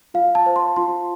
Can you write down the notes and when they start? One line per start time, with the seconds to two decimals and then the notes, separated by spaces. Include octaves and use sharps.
0.14 F4 F5
0.35 A5
0.46 C5
0.56 C6
0.76 F4 C6